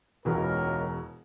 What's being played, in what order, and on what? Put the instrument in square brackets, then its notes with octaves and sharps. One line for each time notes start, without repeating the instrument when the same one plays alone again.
[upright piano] E1 B2 E3 [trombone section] C#2 A#4